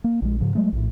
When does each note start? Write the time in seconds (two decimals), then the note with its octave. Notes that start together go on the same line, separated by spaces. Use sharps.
0.04 A#3
0.22 A#1 G#3
0.40 G#2 C#3 F3
0.55 F#3 G#3 A3
0.72 A#1 A2